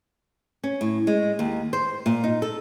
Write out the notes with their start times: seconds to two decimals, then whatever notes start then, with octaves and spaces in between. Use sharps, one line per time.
0.64 C#4
0.81 A2
1.07 G#3
1.39 D#2
1.73 C5
2.06 A#2
2.24 D#4
2.42 A4